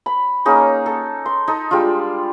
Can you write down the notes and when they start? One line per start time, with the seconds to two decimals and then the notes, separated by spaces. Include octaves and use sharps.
0.06 B5
0.45 A#3 C#4 D#4 G#4
0.86 A4
1.26 C6
1.48 D#4 A4
1.71 G3 G#3 D4 F4